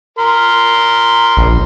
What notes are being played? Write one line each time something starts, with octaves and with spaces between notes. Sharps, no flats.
A#4 C6
A#1